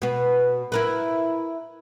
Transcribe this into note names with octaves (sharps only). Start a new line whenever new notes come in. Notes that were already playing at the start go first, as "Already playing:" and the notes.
B2 B3
E4 A#4 B4